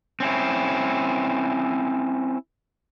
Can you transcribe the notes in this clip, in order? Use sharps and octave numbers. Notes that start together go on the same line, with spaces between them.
C4 C#4 E4